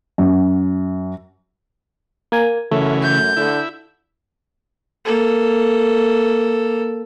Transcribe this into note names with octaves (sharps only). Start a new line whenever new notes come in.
F#2
A#3 G#5
F#2 C#3 E3 A3
G6
D3 E4
A#3 A4